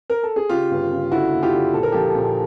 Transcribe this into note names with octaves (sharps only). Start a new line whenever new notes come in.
A#4
A4
G#4
C#3 F4 G4
G1
C#3
D3 E4 F#4
F#1
F4 G4
D3
A#1 A4
A#4
F3 G4 A4
A#1